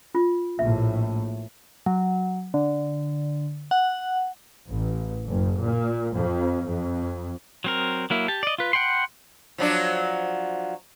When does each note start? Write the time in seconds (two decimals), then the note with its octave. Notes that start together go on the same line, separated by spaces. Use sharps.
0.15 F4
0.59 A#1 A2 E5
1.86 F#3
2.54 D3
3.71 F#5
4.68 A1
5.28 F#1
5.61 A#2
6.14 F2
6.67 F2
7.64 F#3 C4 A#4
8.10 F#3 A#3 E4
8.28 G4 A5
8.43 D5 D#5
8.58 F4 B4
8.73 F#5 G5 B5 C6
9.58 F3 F#3 D4